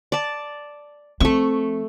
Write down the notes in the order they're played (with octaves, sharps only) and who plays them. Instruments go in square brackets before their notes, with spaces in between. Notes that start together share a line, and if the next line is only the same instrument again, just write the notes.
[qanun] D5 A5
[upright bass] F3 C4 [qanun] A3 C#6